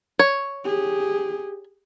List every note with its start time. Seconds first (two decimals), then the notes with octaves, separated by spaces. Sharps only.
0.19 C#5
0.64 G4 G#4